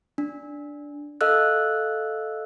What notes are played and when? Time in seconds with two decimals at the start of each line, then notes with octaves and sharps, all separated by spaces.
0.18 D4
1.21 A4 D#5 F5 E6 F#6